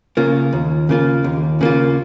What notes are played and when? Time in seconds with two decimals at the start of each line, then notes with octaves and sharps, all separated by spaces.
0.17 C#3 A#3 F4
0.53 D#2
0.89 C#3 A#3 F4
1.24 D#2
1.61 C#3 A#3 F4